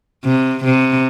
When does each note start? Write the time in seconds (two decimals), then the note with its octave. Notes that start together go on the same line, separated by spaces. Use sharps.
0.25 C3
0.64 C3